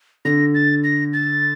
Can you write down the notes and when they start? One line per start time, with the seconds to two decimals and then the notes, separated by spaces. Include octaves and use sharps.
0.25 D3 A#6
0.55 A6
0.84 A#6
1.14 A6